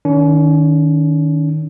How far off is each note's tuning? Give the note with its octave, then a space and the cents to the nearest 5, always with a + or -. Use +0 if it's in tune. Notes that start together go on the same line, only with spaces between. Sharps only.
D#3 +0 C#4 +40